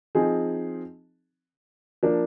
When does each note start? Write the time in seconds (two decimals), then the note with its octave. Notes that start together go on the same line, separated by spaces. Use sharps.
0.15 F3 C4 D#4 G#4
2.03 F3 A#3 D4